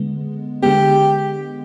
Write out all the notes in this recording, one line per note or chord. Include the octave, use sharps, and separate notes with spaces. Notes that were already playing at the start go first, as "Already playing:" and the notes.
Already playing: D3 G#3 B3
D3 G#3 B3 G4